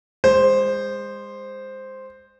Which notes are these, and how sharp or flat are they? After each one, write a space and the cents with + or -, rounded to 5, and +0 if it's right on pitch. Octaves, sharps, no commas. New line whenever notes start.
G#3 -35 C5 +0